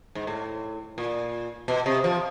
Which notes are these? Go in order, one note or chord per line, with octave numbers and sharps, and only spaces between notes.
G#2
A2
A#2
B2
C3
F3